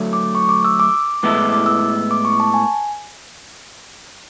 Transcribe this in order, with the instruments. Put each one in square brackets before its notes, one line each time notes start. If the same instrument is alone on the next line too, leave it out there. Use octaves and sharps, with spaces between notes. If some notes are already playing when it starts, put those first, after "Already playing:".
Already playing: [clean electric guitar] D3 F#3 A3
[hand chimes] D6
C#6
D6
E6
D6
[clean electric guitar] A2 G#3 B3 E4 A4 [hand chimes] D6
[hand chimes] D6
D6
E6
D6
C#6
A5
G#5